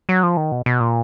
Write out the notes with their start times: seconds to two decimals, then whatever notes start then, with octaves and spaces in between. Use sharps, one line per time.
0.09 F#3
0.23 F3
0.37 D#3
0.52 B2
0.66 B2
0.80 A#2